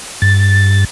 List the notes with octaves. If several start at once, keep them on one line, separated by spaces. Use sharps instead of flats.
G2 A6